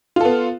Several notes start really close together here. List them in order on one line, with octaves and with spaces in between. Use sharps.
F4 A4 B3